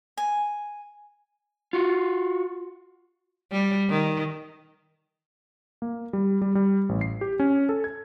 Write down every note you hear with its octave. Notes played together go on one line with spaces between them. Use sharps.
G#5
F4 F#4
G3
D#3
A#3
G3
G3
G3
A1
C7
G4
C#4
A4
G#6